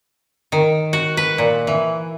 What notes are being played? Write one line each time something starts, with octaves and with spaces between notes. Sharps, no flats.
D#3
F#4
B4
A#2
E3